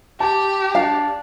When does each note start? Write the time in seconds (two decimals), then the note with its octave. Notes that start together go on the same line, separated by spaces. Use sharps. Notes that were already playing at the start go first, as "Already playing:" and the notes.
0.20 G4 A5
0.75 D4 F5 A5